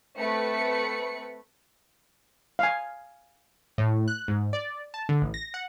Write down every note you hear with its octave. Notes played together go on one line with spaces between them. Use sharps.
A3 C4 B4 B5 C#7
F5 G#5
A2
F#6
G#2
D5
A5
D3
A1
A#6
F#5